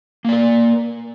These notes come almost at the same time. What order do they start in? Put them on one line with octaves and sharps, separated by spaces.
A#3 D5 A#4